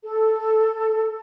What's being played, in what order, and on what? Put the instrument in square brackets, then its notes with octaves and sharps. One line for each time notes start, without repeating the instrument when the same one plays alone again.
[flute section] A4